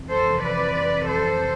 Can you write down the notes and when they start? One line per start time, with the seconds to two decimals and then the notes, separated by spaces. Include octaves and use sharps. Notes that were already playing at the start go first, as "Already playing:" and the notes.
Already playing: F2 C3 E3
0.09 A4 C5
0.42 B4 D5
1.08 A4 C5